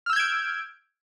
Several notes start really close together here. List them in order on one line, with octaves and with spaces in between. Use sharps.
F6 E6 G6 G#6 D7